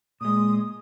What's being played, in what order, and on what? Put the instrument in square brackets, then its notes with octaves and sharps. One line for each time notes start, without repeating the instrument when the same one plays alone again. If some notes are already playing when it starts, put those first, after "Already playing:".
[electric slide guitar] A#2 G#3 [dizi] D#6